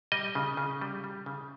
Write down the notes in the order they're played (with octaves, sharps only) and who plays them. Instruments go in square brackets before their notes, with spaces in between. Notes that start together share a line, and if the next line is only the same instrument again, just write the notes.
[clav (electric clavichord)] G3 D#5
C#3
C#3
G3
G3
C#3